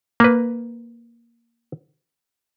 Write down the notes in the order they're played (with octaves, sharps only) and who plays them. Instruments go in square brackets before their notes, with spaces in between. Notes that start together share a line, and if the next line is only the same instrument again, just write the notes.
[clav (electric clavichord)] A#3 B4